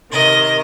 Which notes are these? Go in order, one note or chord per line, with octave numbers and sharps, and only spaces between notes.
C3 D#3 D#5